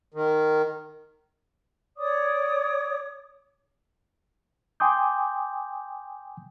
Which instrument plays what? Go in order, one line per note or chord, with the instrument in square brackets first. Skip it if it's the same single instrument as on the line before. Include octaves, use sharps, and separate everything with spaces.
[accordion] D#3
[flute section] C#5 D5 D6 D#6
[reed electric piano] G5 G#5 C6 D6 D#6 G6